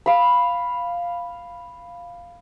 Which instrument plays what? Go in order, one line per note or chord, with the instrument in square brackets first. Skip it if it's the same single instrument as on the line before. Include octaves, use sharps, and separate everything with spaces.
[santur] F5 B5